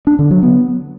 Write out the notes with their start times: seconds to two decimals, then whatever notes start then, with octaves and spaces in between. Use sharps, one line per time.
0.07 D4
0.19 D3
0.31 F#3
0.43 B3